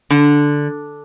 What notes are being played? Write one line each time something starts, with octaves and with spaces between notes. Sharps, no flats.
D3